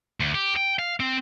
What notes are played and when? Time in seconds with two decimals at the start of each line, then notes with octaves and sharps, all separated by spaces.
0.20 D2
0.35 G4
0.57 G5
0.79 F5
1.00 C4